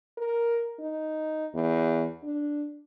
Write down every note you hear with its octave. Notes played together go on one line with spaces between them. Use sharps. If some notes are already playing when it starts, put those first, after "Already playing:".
A#4
D#4
E2
D4